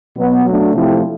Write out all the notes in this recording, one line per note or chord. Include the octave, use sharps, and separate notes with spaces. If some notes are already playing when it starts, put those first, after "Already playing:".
B2 F#3 B3
F#3 A3 D4
C3 F3 A3 C4 E4